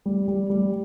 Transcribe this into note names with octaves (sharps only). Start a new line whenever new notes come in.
G3
G3
G3